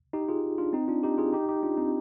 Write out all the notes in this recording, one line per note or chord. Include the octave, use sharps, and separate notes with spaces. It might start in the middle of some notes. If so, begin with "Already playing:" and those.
D#4 G4
F4 G#4
D4 F4
C4 D#4
D4 F4
D#4 G4
F4 G#4
D#4 G4
D#4 G4
D4 F4
C4 D#4